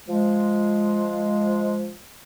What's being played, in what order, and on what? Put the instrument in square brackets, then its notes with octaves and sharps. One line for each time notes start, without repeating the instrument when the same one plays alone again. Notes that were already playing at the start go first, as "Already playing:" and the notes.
[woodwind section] F3 G#3